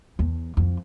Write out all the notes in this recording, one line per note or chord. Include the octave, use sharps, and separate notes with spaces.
E2
F2